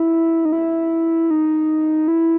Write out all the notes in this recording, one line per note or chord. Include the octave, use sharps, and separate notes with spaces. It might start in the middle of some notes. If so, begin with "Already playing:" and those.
Already playing: E4
D#4
E4
D#4
E4